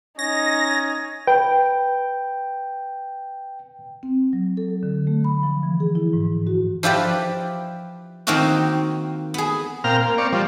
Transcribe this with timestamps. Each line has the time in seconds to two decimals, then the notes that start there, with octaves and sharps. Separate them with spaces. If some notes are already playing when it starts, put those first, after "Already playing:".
0.19 C#4 D#4 G#6 A#6
1.27 B4 G5
4.03 C4
4.33 F#3
4.57 A4
4.83 D3
5.07 A3
5.25 B5
5.43 F3
5.63 E3
5.80 G#4
5.95 E4
6.13 G#2
6.47 F#4
6.83 F3 E4 F4 G4 B4 D5
8.27 D#3 A#3 C4 D#4 F4 F#4
9.34 B3 G#4
9.84 A#2 C4 F5 G5 A#5 F6
10.02 A#3
10.18 C4 D5 C#6
10.32 F3 G3